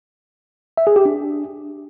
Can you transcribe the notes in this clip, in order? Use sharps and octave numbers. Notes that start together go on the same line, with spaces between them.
E5
G#4
G4
D4